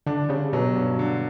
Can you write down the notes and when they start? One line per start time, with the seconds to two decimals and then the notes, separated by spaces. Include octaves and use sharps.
0.06 D3 D4
0.29 C#3 G3
0.53 B2 F#3
0.75 G2
0.99 D3